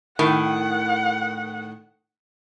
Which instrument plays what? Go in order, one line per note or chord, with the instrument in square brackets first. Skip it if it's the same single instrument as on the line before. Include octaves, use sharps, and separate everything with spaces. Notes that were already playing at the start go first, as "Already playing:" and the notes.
[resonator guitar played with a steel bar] A2 D#3 [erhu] F#5